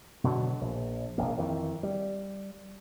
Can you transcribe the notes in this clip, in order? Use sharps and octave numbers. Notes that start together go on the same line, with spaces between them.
B2 D3 E3 F#3
A#1
E1 A#1 A#3
F2 D#3 E3
G3